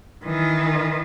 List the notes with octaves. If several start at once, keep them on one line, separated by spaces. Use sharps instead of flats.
D#3 E3